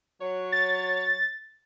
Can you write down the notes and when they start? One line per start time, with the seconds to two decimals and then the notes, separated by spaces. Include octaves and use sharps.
0.21 F#3 C#5
0.52 A6